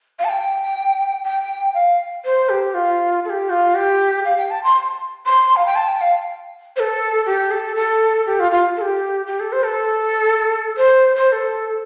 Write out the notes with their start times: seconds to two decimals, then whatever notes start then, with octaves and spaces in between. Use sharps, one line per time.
0.19 F5
0.24 A5
0.29 G5
1.24 G5
1.74 F5
2.25 C5
2.49 G4
2.74 F4
3.25 A4
3.30 G4
3.50 F4
3.75 G4
4.25 F5
4.38 G5
4.50 A5
4.63 C6
5.26 C6
5.56 F5
5.66 G5
5.75 A5
5.88 G5
6.01 F5
6.76 C5
6.80 A4
7.26 G4
7.51 A4
7.76 A4
8.27 G4
8.40 F4
8.51 F4
8.77 A4
8.82 G4
9.26 G4
9.40 A4
9.52 C5
9.65 A4
10.77 C5
11.15 C5
11.28 C5
11.32 A4